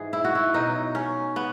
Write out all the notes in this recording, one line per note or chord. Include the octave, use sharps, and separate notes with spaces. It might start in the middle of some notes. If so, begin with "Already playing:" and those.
Already playing: G#2 E3 G#4
E4
F#4
E4
B2 F#3 D#4
C#4
B3